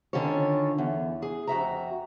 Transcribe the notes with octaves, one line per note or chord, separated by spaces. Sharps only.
D3 D#3 C#4 F4 C#5
E2
G#4
F2 F#4 E5 A#5